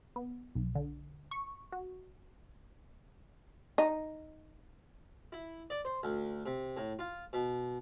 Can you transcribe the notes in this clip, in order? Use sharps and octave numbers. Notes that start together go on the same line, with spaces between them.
B3
B1
D3
C#6
F#4
D#4
E4
D5
C5
D2
C3
A2
F4
B2